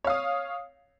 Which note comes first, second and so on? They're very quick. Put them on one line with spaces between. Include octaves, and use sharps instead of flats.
C#5 F5 D#6